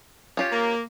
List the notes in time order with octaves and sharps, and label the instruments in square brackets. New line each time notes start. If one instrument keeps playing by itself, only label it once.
[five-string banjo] C#4 F4 G4
[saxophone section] A#3